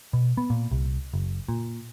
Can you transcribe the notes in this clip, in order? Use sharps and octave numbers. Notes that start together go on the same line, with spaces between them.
B2
B3
A#2
C2
F#1
A#2